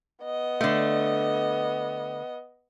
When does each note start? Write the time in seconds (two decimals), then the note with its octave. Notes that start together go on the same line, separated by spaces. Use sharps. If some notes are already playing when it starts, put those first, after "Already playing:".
0.24 B3 D#5
0.61 D3 A3